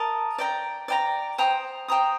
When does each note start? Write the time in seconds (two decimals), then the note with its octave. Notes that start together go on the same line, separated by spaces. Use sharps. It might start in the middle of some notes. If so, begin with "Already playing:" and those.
Already playing: A#4 D#5 A5
0.38 D5 G5 A#5
0.88 D5 G5 A#5
1.38 C5 G5 A#5 D#6
1.88 C5 G5 A#5 D#6